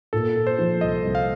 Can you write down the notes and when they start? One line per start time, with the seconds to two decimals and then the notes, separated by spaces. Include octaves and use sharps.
0.13 A#2 A4
0.36 A#2
0.47 C5
0.58 F3
0.81 C2 D#5
1.04 C2
1.15 F5